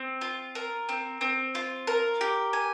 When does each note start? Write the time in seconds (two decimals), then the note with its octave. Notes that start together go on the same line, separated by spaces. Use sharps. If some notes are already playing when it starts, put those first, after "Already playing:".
Already playing: C4
0.21 F4
0.55 A#4
0.89 C4
1.21 C4
1.55 F4
1.87 A#4
2.21 G4
2.53 G#5